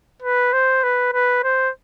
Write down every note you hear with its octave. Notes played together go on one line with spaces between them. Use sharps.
B4
C5
B4
B4
C5